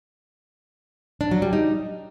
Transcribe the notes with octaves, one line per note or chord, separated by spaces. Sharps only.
D4
F#3
G3
D#4